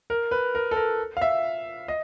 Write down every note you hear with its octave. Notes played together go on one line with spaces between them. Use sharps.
A#4
B4
A#4
A4
A#4
F5
E5
D#5